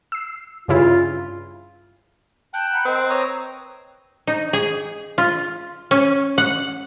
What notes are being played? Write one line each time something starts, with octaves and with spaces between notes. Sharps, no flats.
E6 C7
G2 C#3 E4 F4
G5 A5 F#6
F#5 A#5 B5
C4 A#4 C5 D#5
B4 C#5 A#5 D#6 E6
D#4
G#4
F4
C#4
F#5